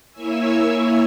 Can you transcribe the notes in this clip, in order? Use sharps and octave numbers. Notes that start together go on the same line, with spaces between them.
A#3 E4 C#5 E5 G#5 E6